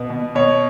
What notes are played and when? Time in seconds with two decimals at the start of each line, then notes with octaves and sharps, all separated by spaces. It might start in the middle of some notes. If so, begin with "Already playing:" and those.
Already playing: B2 B3
0.10 B2
0.35 B2 C#5